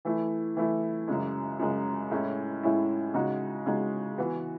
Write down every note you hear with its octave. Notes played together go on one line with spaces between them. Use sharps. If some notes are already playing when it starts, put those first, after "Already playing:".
E3 A3 E4
E3 A3 E4
F#2 C#3 G#3
F#2 C#3 G#3
A2 G#3 C#4 E4
A2 G#3 C#4 E4
C#3 G#3 D#4 F#4
C#3 G#3 D#4 F#4
E3 B3 F#4